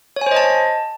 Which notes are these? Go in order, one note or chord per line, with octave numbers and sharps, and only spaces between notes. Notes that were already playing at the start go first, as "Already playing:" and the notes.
C#5
G#5
C5
D#5
A5